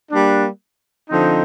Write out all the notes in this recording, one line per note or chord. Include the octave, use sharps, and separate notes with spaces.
G3 A#3 D4
D3 F3 C4 D#4